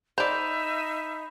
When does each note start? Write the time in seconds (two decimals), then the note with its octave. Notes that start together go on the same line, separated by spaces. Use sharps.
0.18 D#4 C5 D5 E5 B5 G6 F7